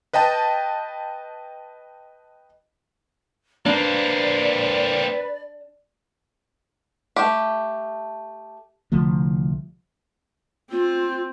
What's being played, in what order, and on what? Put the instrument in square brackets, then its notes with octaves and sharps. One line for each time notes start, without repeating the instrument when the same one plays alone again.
[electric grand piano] B4 D#5 G5 A5
[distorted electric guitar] A#3 C4 [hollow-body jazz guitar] D4 [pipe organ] B4 [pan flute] D5
[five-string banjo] A3 G4
[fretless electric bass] C2 D3 F3 A3
[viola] C4 [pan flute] F4